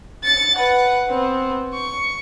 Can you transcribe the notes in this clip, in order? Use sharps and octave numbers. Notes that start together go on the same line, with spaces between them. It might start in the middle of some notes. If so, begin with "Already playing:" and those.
A6 C#7
B4 F#5
B3 C4
C#6